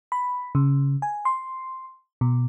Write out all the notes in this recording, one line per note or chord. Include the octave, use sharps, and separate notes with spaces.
B5
C#3
G#5
C6
B2